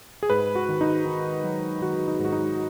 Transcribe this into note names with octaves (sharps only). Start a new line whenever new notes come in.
G#4
G#2 B4
F#4
D#3
D#4
D#3
F#3
D#3 F#4
D#4
G#2
F#4
D#4